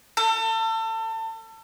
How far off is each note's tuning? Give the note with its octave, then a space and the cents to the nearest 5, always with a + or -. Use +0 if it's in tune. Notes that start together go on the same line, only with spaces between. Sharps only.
A4 +30